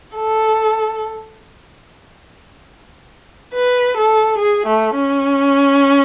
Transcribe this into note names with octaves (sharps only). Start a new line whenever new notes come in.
A4
B4
A4
G#4
A3
C#4